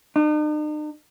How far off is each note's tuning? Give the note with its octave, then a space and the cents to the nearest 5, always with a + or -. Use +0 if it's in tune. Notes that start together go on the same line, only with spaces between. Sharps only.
D#4 -45